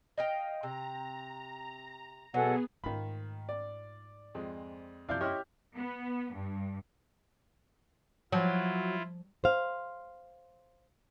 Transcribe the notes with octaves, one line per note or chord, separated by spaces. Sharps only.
D#5 F5 G5
C3 A#5
B2 F#3 B3 G#4 A4 F#5 G#5
G#2 D#3 A3 F4 B5
D5
F2 G#3 C4
F#2 C3 F3 E4 D5 F5 G6
E4 G4 C#5 D#5 C6 F6
B3
G2
F3 F#3 E4 F4
C5 F5